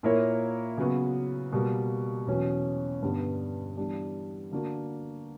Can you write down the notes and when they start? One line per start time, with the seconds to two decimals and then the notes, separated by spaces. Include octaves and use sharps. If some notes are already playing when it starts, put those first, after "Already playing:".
0.03 A#2 A#3 E4 A#4 C#5
0.78 C#3 F#3 B3 F#4
1.53 B2 G3 A#3
2.27 E2 B2 F#3 C#4
3.02 G2 D3 G3 B3 D4
3.77 E3 G3 B3 D4
4.51 D3 A#3 D4 F#4